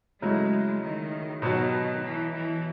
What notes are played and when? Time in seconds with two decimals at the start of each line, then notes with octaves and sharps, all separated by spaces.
0.22 C#3 F#3 G#3 A3 E4
0.83 D#3
1.42 B2 D#3 F#3 B3 F#4
2.02 E3
2.32 E3